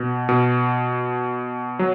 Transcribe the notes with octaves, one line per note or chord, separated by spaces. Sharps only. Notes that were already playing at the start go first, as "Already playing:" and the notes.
Already playing: B2
B2
F#3